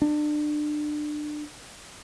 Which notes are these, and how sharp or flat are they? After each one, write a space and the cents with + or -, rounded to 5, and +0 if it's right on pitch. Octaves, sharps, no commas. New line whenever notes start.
D4 +30